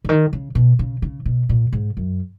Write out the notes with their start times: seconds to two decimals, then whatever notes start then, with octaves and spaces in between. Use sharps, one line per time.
0.05 C#3
0.09 D#3
0.33 C#3
0.55 B2
0.79 C#3
1.02 C#3
1.25 B2
1.49 A#2
1.73 G#2
1.97 F#2